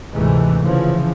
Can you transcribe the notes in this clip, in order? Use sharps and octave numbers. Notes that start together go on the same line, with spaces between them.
D2 G#2 C3 E3 A3
C#3 E3 F3